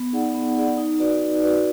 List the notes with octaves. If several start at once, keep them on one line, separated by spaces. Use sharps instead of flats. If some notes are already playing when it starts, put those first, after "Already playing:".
Already playing: B3
D#4 G#4 D5 F#5
B3
D#4 G#4 D5 F#5
D#4
F#4 B4 D5
D#4
F#4 B4 D5